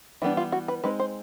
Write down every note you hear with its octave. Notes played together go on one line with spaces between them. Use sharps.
E3 G3 B3 D4 E4
F4
F#4
B4
G#3 C4 D#4 B4
C5